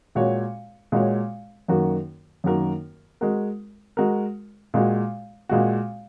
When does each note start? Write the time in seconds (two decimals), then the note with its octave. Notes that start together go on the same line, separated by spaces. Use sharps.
0.15 A#2 G#3 F#4 C#5
0.92 A#2 G#3 F#4 C#5
1.68 F#2 D#3 A#3 F#4 A#4
2.44 F#2 D#3 A#3 F#4 A#4
3.21 G#3 F#4 A#4
3.97 G#3 F#4 A#4
4.74 A#2 G#3 F#4
5.49 A#2 G#3 F#4